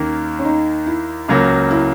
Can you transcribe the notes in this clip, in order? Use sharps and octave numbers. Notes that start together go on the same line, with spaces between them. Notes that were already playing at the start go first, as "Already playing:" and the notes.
Already playing: D#2 D#3 A#3 C#4
C#4
D#4
E4
C#2 C#3 F#3 A#3
E4